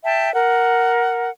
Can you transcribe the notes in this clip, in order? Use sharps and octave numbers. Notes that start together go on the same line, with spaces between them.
E5 G5 A5
A#4 F#5